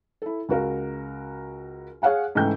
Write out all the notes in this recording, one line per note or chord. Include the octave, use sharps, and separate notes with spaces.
E4 A4
C#2 F#4 A#4 F5
G#4 C#5 F5 F#5 G#5
G#2 C#3 E3 A3 G5 G6